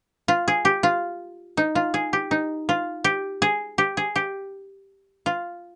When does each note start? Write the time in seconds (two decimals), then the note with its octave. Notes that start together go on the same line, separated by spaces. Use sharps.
0.28 F4
0.48 G#4
0.65 G4
0.83 F4
1.57 D#4
1.75 F4
1.94 G#4
2.13 G4
2.31 D#4
2.69 F4
3.04 G4
3.42 G#4
3.78 G4
3.97 G#4
4.16 G4
5.26 F4